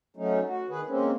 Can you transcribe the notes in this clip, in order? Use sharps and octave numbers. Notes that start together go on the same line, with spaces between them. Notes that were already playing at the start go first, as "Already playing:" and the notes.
F#3 A3 C#4 D#4
F#4
D#3 G#4 B4
G#3 A#3 C4 C#4